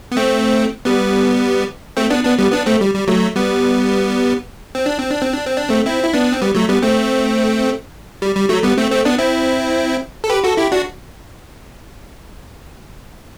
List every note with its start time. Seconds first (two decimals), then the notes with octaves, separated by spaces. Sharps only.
0.12 B3
0.17 A3 C4
0.85 G3 B3
1.97 A3 C4
2.10 B3 D4
2.24 B3 D4
2.39 G3 B3
2.52 B3 D4
2.66 A3 C4
2.81 G3
2.94 G3
3.08 F#3 A3
3.36 G3 B3
4.75 C4
4.86 D4
4.99 C4
5.11 D4
5.22 C4
5.33 D4
5.46 C4
5.57 D4
5.69 A3 C4
5.86 C4 E4
6.03 E4
6.14 B3 D4
6.32 C4
6.41 G3 B3
6.55 F#3 A3
6.69 G3 B3
6.82 A3 C4
8.22 G3
8.36 G3
8.49 F#3 A3
8.63 G3 B3
8.78 A3 C4
8.91 A3 C4
9.05 B3 D4
9.19 C4 E4
10.24 A4
10.30 G4 B4
10.44 F#4 A4
10.57 E4 G4
10.72 D4 F#4